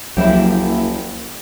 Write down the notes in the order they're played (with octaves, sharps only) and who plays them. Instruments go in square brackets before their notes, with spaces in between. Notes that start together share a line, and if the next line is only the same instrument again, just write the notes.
[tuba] F#1 [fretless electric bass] C#2 F3 F#3 [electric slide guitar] A#3 E4 [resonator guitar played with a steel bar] G4 E5